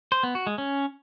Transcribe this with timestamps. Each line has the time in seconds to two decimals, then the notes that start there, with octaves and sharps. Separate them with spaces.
0.12 C5
0.23 B3
0.35 F#4
0.47 G#3
0.58 C#4